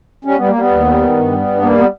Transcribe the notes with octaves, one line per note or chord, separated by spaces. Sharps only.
G3 C#4
G3 B3
A#3
G3 B3
D#2
G3
D#3
G2
G3
G2
G3 A#3
B3